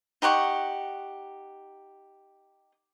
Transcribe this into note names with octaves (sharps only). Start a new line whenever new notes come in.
D#4 G4 F#5 C#6